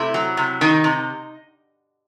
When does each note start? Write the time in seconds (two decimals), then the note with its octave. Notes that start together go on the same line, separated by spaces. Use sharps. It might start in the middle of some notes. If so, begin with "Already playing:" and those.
Already playing: C3 A3 E4
0.14 F#3
0.37 C3
0.61 D#3 D#4
0.84 C3